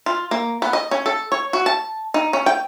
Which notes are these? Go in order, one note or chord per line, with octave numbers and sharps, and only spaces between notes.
F4
A#3
B3
D#5
C#4
A4
C#5
F#4
A5
D#4
C#4
G5